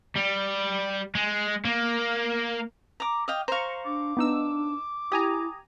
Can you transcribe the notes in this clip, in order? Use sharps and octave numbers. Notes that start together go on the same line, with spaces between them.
G3
G#3
A#3
A#5 D6
D#5 F5 G5
C5 F5 A#5 C#6
D4 D6
B3 D4 D#4 E6
E4 G4 G#5 A#5 D#6